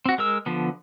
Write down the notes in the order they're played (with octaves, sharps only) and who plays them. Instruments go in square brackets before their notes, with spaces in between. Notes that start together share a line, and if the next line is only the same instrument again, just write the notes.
[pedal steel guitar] C4 F#4
G#3 A#4 E6
D3 F3 B3